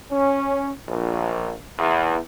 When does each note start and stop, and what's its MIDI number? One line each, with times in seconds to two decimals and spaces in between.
0.12 0.70 61
0.89 1.54 34
1.79 2.17 40